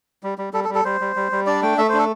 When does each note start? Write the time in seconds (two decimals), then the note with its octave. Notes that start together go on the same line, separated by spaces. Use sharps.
0.23 G3
0.38 G3
0.53 G3 A4
0.64 A4
0.69 G3
0.75 A4
0.85 G3 C5
1.01 G3
1.16 G3
1.32 G3
1.46 D4 D5
1.62 A3 G5
1.78 A3 E5
1.89 D4 C5
1.99 A4